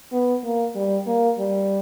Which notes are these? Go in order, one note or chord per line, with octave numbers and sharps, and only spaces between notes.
B3
A#3
G3
A#3
G3